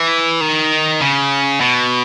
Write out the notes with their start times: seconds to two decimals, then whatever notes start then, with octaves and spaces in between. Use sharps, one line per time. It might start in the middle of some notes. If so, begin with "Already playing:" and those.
Already playing: E3
0.41 D#3
1.01 C#3
1.61 B2